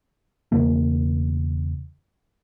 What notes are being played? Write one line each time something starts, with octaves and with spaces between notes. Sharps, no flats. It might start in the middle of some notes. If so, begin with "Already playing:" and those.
E1 E2 C#3 A#3